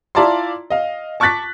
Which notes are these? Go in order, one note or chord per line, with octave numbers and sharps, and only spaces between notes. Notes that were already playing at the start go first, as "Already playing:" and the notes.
E4 F4 D5 A5 A#5 C6
D#5 F5
A5 C#6 D6 F#6 A6 B6